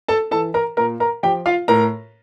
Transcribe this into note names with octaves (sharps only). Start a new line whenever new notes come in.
A4 A5
E3 A4 A5
A#4 A#5
A#2 A#4 A#5
A#4 A#5
F3 G4 G5
F4 F5
A2 A#4 A#5